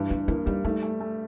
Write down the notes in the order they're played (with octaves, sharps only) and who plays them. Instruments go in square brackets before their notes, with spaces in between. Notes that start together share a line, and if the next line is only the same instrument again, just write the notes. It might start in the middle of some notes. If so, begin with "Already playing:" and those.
Already playing: [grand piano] G2 E3
[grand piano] G2 [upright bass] A#3
[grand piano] A#3 [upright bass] E4
[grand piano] G3 [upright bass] D#4
[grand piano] A3 [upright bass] D#4
[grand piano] A3
A3